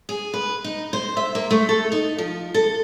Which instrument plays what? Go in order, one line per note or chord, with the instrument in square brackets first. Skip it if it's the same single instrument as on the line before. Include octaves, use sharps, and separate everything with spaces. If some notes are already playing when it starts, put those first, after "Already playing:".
[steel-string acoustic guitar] G#4
B4
D#4
C5
E5
A#3
A3
A4
D#4
F3
A4